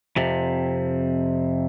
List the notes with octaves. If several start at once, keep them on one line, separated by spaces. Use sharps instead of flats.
F2 C3